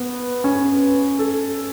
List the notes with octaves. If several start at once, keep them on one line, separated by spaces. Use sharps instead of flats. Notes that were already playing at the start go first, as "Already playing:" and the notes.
Already playing: B3
C#4
A4